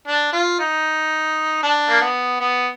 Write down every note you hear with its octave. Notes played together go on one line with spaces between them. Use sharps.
D4
F4
D#4
D4
A#3
B3
B3